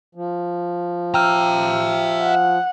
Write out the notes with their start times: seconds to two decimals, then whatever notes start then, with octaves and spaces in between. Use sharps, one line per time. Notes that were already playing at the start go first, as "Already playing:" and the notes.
0.15 F3
1.14 E5 G5 A#5 E6 F6
2.21 F#5